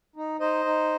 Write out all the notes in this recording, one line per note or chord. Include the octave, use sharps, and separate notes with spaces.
D#4
D#4 C5 D#5
D#4